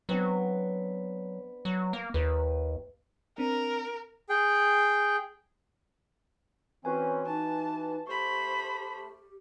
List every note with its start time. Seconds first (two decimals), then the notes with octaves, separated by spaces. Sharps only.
0.09 F#3 B3 C4 D4
1.65 F#3
1.93 A#3
2.14 D#2 B4
3.38 C4 D4 A#4
4.29 G#4 G5
6.85 E3 C4 C#4 F#4 B4 G#5
7.26 E3 D#4 A5
8.07 A3 G4 C5 B5 C#6